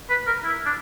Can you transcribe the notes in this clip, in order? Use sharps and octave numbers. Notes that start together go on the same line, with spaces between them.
B4
A#4
E4
D4